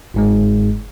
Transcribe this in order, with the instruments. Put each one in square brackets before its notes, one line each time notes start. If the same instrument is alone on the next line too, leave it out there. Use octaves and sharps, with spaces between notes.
[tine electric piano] G1 G#2 G#3